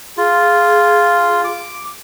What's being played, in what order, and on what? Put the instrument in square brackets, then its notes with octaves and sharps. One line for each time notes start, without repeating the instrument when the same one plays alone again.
[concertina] F4 [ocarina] G#4
[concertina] D6